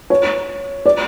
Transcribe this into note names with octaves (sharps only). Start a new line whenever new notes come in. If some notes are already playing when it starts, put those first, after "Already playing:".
C#5
D5